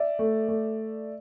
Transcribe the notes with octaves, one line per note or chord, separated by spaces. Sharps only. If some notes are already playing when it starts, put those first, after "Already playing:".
Already playing: D5 E5
A3
A3